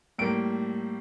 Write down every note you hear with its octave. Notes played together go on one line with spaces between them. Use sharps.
A2 G3 A#3 D7